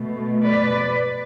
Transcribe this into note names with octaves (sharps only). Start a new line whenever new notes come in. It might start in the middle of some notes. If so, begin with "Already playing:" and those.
Already playing: B2 A3
B4 D5